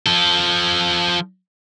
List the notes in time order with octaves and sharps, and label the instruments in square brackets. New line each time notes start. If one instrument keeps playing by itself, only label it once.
[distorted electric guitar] F3 A4